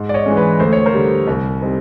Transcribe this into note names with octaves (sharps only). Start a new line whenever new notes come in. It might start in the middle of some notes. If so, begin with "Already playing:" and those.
Already playing: G#2
D5
C#5 D#5
E3 G#3 C#4
B4
D2 C5
C#5
A#4 C5
D3 G3
C2
G3 C4 D#4